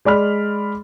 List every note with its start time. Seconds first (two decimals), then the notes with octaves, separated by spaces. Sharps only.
0.05 G#3 D5 B5 F6